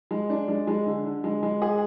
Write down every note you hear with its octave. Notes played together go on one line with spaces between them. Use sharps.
G#3
D4
G#3
G#3
D3
D3
G#3
G#3
G#4